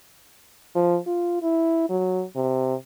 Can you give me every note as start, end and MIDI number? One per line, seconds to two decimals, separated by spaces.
0.75 0.98 53
1.07 1.40 65
1.42 1.89 64
1.90 2.23 54
2.36 2.75 48